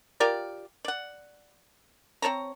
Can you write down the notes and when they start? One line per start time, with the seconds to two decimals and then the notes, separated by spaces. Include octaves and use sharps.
0.20 F4 G4 A#4 D5
0.85 D5 F#5
2.22 C4 C#5 A5 A#5